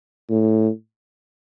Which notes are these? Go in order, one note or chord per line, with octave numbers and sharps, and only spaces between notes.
A2